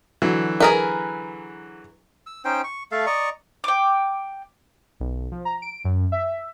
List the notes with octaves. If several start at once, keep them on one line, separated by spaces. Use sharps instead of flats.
D3 E3 F#3
G#4 A#4 B4
E6
C#4 D#4 C5 G5
C#6
A3 A4 F5
D5 D#5 A#5 C#6
G5 D6
B1
F3
A#5
D7
F#2
E5